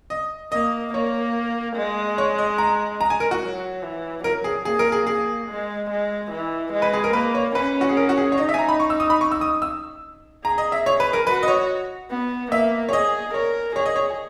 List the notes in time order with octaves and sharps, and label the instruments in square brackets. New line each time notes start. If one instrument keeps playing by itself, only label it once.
[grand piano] D#5
[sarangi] A#3 [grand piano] D#5
[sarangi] A#3 [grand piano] C#5
[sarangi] G#3
[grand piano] C#5
D#5
A#5
A#5
G#5
A#4
F#4
[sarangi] F#3
E3
[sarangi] F#3 [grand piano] A#4
[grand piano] G#4
[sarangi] A#3 [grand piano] G#4
[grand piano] A#4
G#4
G#4
[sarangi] G#3
G#3
E3
G#3
[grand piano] B4
G#4
A#4
[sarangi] A#3 [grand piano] B4
[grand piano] C#5
[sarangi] C#4 [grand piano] B4
[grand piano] F#4
G#4
A#4
F#4
G#4
C#5
[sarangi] D#4 [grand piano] D#5
[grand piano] E5
G#5
A#5
B5
C#6
E6
D#6
B5
C#6
E6
D#6
E6
[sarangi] G#4 [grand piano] A#5
[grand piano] D#5
E5
C#5
B4
A#4
[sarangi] F#4 [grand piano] B4
[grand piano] D#5
C#5
[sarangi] B3
[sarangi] A#3 [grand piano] E5
[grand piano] C#5
[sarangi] G#4 [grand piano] D#5
[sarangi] A#4 [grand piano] C#5
[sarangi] G#4 [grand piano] C#5
[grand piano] D#5
C#5